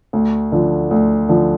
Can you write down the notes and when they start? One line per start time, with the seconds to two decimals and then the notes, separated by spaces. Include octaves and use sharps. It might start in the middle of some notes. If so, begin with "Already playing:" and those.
0.13 D2
0.52 D3 F3
0.91 D2
1.29 D3 F3